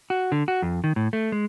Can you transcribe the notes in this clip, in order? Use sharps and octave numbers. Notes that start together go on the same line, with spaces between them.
F#4
D3
F#4
F2
D#3
A2
A3
G#3